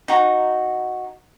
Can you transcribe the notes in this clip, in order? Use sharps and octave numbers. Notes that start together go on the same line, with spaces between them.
D#4 F#4